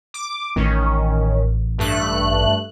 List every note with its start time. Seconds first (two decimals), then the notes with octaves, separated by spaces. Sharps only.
0.14 D6
0.56 A1 D#3 C#4
1.78 G2 A3 F#6